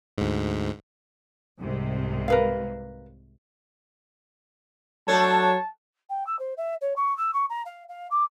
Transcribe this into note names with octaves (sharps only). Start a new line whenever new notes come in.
D2 G#2
C2 G#2 C3
A#4 B4 F5
F#3 A3 D4 A4 C#5 A5
G5
E6
C5
E5
C#5
C#6
E6
C#6
A#5
F5
F5
D6